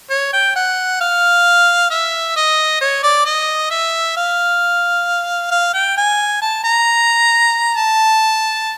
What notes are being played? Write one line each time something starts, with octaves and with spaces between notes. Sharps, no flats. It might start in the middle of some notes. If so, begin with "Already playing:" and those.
C#5
G5
F#5
F5
E5
D#5
C#5
D5
D#5
E5
F5
F5
G5
G#5
A5
A#5
A5